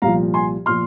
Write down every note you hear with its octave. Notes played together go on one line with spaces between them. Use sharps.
C2 A#2 F3 F5 A#5
G#5 C6
A#2 F3 C6 F6